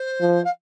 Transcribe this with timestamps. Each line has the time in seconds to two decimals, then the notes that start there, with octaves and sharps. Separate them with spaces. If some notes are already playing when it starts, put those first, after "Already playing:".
Already playing: C5
0.20 F3
0.44 F5